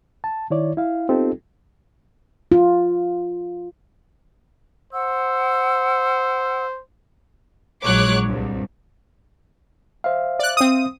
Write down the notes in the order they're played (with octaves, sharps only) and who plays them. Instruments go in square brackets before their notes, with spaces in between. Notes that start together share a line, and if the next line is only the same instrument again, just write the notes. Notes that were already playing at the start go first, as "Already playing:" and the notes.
[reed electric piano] A5
D#3 E4 C#5 D5
E4 F5
B3 C4 D#4 F4 G4 A4
[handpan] F4
[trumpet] C5 [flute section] F#5 E6
[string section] A#1 F#3 G#3 C#5 D6 F#6
C2 G2
[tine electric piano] C5 E5 F5
[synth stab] D5 F#6
C4 D#6